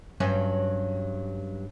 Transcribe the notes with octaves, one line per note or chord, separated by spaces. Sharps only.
G2 F#3 C#4